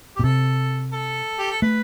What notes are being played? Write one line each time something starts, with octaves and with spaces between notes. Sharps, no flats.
G4
B2
C3 A4
A4
G4
A4
A3 B4